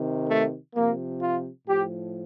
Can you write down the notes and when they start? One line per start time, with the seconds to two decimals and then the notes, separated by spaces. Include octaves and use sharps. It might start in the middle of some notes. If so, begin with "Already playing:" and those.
Already playing: C3 D#3
0.29 A3
0.75 C3 F3 A#3
1.21 F4
1.67 A2 F3 G4